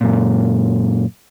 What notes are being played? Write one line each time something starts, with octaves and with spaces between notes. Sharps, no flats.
F#2 A#2